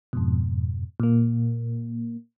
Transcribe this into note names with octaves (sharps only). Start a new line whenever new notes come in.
F2 G#2 B2
A#2 A#3